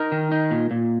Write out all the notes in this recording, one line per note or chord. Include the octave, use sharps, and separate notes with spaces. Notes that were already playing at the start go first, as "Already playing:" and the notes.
Already playing: D#4 A#4
D#3
D#4
A#2
A#2